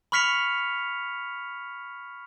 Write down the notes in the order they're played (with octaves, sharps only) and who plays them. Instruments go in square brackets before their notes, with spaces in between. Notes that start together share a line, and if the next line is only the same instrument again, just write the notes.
[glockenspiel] B5 C#6 F6 B6 C#7 F7